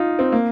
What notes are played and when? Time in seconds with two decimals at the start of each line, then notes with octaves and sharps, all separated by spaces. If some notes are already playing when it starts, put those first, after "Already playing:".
Already playing: D#4 F4
0.19 C4
0.32 A#3